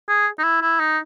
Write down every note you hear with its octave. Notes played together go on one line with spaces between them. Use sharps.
G#4
D#4
E4
E4
D#4